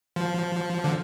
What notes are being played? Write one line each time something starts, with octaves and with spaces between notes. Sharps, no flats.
F3
D3